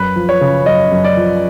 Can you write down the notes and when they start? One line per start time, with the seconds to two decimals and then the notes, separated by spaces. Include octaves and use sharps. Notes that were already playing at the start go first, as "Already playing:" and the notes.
Already playing: F#2 B4
0.16 F3
0.29 C#5
0.41 C#3
0.66 F#2 D#5
0.92 F#2
1.04 D5
1.17 F3